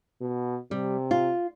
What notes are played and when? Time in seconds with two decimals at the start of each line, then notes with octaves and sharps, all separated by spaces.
0.21 B2
0.71 C3 G3
1.11 F4